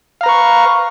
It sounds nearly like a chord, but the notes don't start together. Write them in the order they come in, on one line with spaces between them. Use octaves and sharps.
F5 A#5 B4 C#6